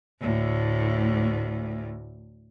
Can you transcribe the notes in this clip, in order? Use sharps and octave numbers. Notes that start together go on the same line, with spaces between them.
D2 A2